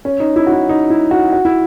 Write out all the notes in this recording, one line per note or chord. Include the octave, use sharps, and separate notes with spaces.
C#4
D#4
E4
F#4
E4
D#4
E4
F#4
F#4
E4